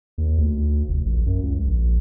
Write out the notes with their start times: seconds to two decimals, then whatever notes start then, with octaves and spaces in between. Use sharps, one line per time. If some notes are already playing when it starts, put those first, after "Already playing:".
0.18 D#2
0.38 D2
0.88 F1
1.06 A#1
1.26 F#2
1.43 C#2
1.67 A#1